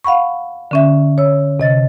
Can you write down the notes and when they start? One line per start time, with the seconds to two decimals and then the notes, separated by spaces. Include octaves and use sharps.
0.04 F5 F#5 B5 C#6
0.71 D3 C#4 E5
1.18 C#5 E6
1.60 C3 D#5 A6